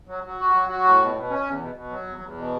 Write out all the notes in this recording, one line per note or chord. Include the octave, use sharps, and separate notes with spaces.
F#3
F#3
F#4
F#3
F#4
A2
B2
B2
C#4
E2
B2
B2
F#3
E2
E2
B2